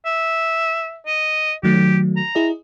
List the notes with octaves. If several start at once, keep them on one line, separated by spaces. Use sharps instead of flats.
E5
D#5
D#3 F#3 A3 G4
A#5
E4 G#4 D#5